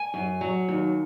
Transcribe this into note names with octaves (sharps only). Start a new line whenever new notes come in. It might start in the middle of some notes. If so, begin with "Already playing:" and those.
Already playing: G#5
F#2
F#3
D#2